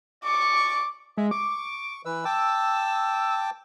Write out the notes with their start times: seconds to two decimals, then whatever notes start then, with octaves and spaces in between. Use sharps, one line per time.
0.24 D5 C#6 D6
1.17 G#3 E5
1.31 C#6 D6
2.05 E3 B4 E6
2.25 G5 A5 D6 E6